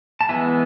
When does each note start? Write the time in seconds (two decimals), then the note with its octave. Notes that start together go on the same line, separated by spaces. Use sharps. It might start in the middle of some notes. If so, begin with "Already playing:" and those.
0.21 A5
0.29 E3 G#3 B3 E5 G#5